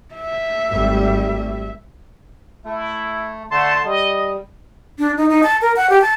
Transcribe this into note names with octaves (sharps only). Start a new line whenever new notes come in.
E5
G#1 G3 A3
A3 E4
D3 A3 A5 C6
G3 D#5
D4
D#4
D#4
A5
A#4
F#5
G4
A5